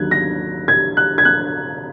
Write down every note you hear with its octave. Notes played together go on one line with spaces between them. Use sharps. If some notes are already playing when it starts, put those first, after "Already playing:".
Already playing: D#2 D#3 F#3 F#6 G#6
A#6
G#6
F#6
G#6
F#6